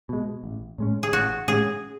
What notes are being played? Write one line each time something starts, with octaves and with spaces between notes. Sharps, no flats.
B2 G#3
A1
A2 G#3 C#4
G#4
A1 F#4
A2 G#3 C#4 G#4